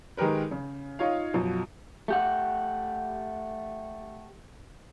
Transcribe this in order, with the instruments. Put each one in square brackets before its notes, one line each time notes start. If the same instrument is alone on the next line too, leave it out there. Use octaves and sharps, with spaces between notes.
[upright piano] D#3 G#3 G4 A#4 B4
C#3
D#4 F4 C#5 F5
F#2 B2 F3
[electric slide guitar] A3 G4 F#5